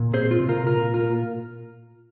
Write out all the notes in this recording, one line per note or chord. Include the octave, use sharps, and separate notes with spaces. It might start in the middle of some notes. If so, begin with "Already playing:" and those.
Already playing: A#2
C4 G#4 C5
F4
C3
F4 A#4
A#2 F4 A#4
A#3 F4 A#4